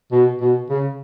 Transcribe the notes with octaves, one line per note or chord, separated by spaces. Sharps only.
B2
B2
C#3